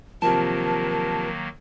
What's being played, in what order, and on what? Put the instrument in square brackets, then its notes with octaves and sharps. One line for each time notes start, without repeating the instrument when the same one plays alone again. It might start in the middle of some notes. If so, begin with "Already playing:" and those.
[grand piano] C3 F3 [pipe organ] D#3 F#3 A#3 [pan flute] A#4 [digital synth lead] A5